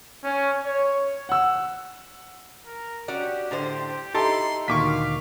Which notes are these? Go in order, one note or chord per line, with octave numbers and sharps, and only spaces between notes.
C#4
C#5
F#5 E6
A#4
C#4 F#4 G4 D5
A2 D3 C5
D#4 E4 G4 A4 C6
D2 A#2 D#3 F5 C#6 D6 B6